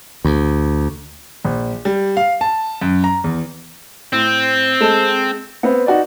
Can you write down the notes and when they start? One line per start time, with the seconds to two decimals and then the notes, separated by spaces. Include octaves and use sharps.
0.25 D2
1.45 A#1
1.85 G3
2.17 F5
2.41 A5
2.82 F#2
3.04 A#5
3.24 E2
4.13 A2 C4
4.81 G#3 A4 E7
5.63 B3 C4 B4
5.86 D#4 F#4 D5